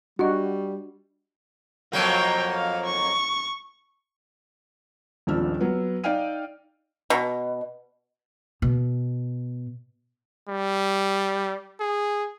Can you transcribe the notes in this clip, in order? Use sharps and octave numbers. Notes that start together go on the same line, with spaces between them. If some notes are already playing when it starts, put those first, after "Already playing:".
G3 D4 F#4 D#5
F2 F#3 A#3 C#5 G5
F5
C#6
D#1 G#1 F3 D4 E6 F6
F#3 B3
D#4 D5 F5 G5 F6 D#7
B2
B2
G3
G#4